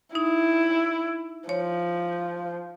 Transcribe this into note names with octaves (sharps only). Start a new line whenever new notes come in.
D#4 E4
F3 C#5